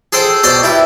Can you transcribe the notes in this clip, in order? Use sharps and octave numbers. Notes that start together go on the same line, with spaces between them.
G#4 A4 C5 G5
B2 C5 D5 G5 A5 C6
E4 G4 B4